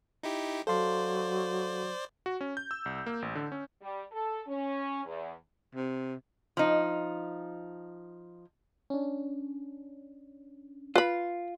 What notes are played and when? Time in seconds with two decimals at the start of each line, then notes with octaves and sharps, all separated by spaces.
0.23 D#4 E4 G4
0.67 F#3 A4 C5 D5 F5 C6
2.26 F#4
2.41 C#4
2.57 G6
2.71 E6
2.86 C2
3.06 A#3
3.22 A1
3.35 D3
3.52 C#4
3.82 G3
4.12 A4
4.47 C#4
5.05 E2
5.75 C3
6.57 F3 D#4
8.90 C#4 D4
10.96 F4 B4 B5